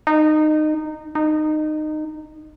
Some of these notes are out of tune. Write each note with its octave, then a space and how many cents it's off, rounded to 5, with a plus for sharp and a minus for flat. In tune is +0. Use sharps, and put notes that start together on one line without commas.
D#4 -20
D#4 -20